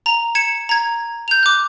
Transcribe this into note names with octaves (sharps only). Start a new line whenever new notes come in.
A#5 F7
G#6 C#7 E7
A#5 G#6
G6 F7
D6 F#6